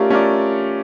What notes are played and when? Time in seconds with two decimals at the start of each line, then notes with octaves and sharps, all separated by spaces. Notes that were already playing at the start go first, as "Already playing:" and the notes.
Already playing: A3 C#4 F4 G4 A#4 D5
0.10 A3 C#4 F4 A#4 D5